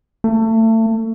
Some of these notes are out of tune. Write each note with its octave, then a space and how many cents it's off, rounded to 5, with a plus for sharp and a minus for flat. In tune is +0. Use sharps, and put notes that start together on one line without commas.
A3 +30